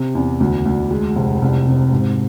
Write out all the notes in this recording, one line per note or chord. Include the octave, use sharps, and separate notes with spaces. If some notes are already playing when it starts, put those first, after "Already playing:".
Already playing: C3
E2
D2
D2
G#3
F1
C2
C3
G#2